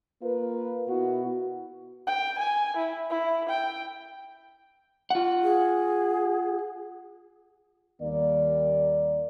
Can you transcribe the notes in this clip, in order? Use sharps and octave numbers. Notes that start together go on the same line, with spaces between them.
A#3 F4 A#4 B4
B2 B3 E4 F#4
G5
G#5
E4
E4
G5
F4 F#5
G#4
D#2 D#3 G3 A#3 D5